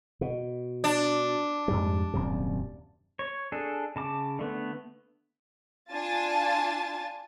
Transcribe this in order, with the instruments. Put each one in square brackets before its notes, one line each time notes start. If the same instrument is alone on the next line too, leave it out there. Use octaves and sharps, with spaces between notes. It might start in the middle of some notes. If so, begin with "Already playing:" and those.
[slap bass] B2
[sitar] D4
[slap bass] F2 G#2 G3
D#1 F#2 C3
[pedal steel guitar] C#5
D4 G#4 A4
C#3 A5 D6
D3 A3 B3
[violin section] D4 F4 G#5 A5 A6